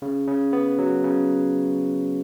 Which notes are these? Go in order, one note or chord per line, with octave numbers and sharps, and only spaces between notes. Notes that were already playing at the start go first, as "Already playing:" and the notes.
C#3
C#3
B3
F#3
C#3